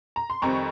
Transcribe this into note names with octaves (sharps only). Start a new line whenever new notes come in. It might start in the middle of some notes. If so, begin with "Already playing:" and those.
A#5
C6
F2 D#3 G3 C4 A#5 C#6